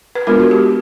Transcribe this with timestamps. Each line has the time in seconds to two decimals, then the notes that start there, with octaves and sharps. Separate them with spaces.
0.15 B4
0.27 G#3 B3 D4 F4 A#4
0.40 F#4
0.51 G4